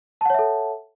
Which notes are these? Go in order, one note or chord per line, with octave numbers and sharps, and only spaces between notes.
A4 C#5 E5 F#5 A5